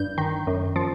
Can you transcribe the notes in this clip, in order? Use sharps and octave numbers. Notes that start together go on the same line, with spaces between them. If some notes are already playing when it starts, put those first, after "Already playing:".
Already playing: G2 G6
D#3
F#2
F3